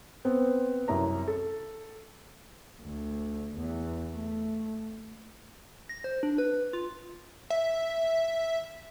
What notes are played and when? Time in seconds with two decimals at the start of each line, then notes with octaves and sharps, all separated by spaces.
0.25 B3 C4 C5
0.88 C2 F#2 A#4 C#5 A#5
1.28 A4
2.81 D2
3.56 E2
4.14 A3
5.89 A#6
6.04 C5
6.23 D4
6.38 B4
6.73 F4
7.50 E5